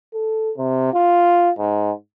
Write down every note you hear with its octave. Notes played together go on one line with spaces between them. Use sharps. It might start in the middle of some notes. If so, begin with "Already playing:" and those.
A4
C3
F4
G#2